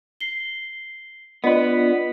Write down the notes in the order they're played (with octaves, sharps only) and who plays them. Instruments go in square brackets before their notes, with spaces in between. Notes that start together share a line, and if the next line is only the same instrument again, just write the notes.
[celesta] C7 G7
[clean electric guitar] B3 B4 [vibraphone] D4 F4 D5 [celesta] D#5